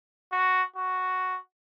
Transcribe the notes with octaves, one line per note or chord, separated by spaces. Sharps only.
F#4
F#4